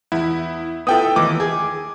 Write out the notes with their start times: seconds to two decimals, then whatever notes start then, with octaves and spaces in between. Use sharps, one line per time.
0.12 E2 E4
0.87 B3 E4 A4 G5 D#6
1.16 D#2 E3 D6
1.40 G#4